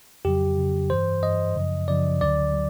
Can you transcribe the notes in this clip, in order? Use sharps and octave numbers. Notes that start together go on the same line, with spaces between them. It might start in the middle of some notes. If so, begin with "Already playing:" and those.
F2 C#3 F#3 G4
F2 C#3 F#3
G2 E3 C5
G2 E3 D#5
F#2 C#3 F3
F#2 C#3 F3 D5
D2 D3 F#3 D5
D3 F#3